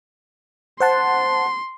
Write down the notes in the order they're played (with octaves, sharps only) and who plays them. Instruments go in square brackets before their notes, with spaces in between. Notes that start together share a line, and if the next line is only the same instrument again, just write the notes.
[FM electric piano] C5 F#5 A5 [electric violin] C6